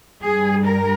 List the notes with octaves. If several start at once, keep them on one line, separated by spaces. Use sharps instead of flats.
G2 G3 G#4
A#4